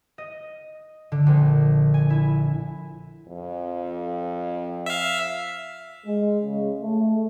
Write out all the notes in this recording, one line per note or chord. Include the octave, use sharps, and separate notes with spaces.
D#5
D3
A#1
G#5
E4
F2
E5 F5
G#3
C#3
A3